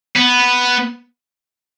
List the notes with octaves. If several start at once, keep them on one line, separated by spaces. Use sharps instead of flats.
B3